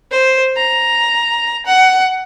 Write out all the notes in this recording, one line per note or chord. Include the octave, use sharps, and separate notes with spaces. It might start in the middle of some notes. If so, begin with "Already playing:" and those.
C5
A#5
F#5